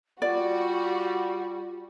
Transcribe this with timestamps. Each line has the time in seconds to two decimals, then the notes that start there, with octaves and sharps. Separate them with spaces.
0.22 G3 F4 F#4 D5